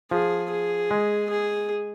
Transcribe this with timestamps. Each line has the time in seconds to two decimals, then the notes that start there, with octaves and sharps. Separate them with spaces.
0.11 F3 G#4
0.51 G#4
0.91 G#3
1.30 G#4